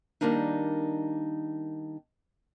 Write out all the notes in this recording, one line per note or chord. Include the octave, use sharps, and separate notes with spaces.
D#3 G3 G#3 A#3 D4 D#4